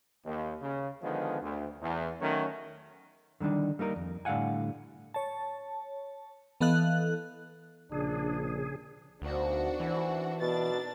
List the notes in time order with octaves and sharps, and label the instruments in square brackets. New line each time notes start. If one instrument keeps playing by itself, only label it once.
[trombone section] D#2
C#3
D3 D#3 F3 G#3 B3
D2
E2
D#3 F#3 A3 C#4
[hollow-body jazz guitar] D3 D#3 G3 D4 D#4
G3 A#3 D#4 A#4
F2
A2 D3 G3 F5 F#5 G#5
[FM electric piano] C#5 A5
E3 B3 A4 D#5 F5 F#6
[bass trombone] A#1 [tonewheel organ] C#3 G#4 [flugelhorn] D4
[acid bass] D2 [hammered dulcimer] B2 D#3 F3 [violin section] D4 F#4
[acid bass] E3 [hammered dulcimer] A3 C4
[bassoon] B2 [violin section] D4 A6 [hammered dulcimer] D#4 A#4